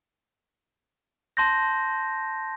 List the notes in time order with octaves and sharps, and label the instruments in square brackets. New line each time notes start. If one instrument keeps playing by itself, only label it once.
[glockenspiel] A5 C6 G6 A#6